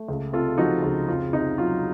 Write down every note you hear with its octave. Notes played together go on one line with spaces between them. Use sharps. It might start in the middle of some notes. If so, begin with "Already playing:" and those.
Already playing: A3
C#2
C3 F4 A4
F3 D#4 F#4
C#2
F2 F4
C3 D#4
F#3 F4